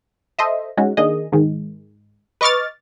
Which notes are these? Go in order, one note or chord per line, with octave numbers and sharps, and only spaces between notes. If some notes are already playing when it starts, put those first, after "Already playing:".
A4 C5 D#5 E5
G#3 C#4 D#4 F#4
D#3 A#3 D4 G#4 D#5
G#2 D#3 G#3
B4 D#5 C#6 D6 F6 A6